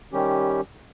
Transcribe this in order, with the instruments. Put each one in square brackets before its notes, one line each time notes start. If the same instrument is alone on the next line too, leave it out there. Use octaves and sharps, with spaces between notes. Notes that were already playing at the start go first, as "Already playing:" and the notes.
[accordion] D#3 G3 C#4 G4